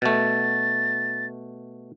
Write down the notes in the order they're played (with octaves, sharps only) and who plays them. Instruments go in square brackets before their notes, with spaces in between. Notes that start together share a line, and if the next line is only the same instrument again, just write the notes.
[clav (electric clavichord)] B2 A3 [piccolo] A6